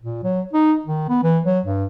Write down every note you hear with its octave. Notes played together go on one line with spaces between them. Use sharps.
A#2
F#3
D#4
D#3
B3
E3
F#3
G2